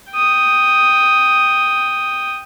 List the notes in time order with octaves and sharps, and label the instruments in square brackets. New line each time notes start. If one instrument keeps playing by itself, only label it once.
[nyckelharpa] G5 D#6